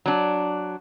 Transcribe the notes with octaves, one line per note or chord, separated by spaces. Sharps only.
F#3 D4